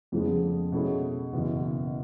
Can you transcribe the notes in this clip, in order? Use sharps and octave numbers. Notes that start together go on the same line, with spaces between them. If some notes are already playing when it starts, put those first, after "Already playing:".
F2 C#3 F3 G#3 B3
B2 G#3 C#4 E4 A4
F#1 E2 B2